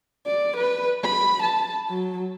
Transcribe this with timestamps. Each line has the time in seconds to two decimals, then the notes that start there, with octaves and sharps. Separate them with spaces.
0.26 D5
0.57 B4
1.04 B5
1.43 A5
1.89 F#3